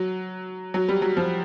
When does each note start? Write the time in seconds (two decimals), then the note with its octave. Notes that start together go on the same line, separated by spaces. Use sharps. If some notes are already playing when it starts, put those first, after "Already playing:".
Already playing: F#3
0.74 F#3
0.89 G3
1.02 F#3
1.17 F3